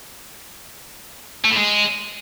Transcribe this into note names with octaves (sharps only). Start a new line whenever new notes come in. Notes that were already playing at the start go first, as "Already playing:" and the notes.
A3
A2
G#3